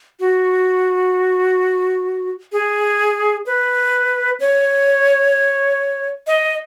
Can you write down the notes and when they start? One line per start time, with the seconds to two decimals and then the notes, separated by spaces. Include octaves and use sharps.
0.20 F#4
2.52 G#4
3.46 B4
4.40 C#5
6.27 D#5